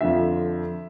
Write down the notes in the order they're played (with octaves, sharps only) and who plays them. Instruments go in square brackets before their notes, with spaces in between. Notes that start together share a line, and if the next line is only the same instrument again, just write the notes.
[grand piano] F2 D3 F3 E5